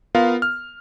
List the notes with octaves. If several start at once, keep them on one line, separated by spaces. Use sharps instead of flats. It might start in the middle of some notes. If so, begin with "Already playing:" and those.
B3 F4 A#4 F5
F6